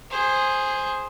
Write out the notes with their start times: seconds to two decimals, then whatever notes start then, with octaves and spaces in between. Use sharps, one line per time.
0.10 G#4 C5